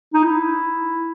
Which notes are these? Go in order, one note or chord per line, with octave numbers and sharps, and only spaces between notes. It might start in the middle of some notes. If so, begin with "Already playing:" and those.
D#4
E4